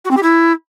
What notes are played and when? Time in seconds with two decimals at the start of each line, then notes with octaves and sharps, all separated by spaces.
0.05 F#4
0.11 C4
0.17 G4
0.23 E4